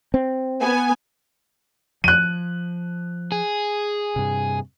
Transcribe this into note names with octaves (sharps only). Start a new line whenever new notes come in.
C4
B3 G#5
F3 F#6 D#7
G#4
G2 C3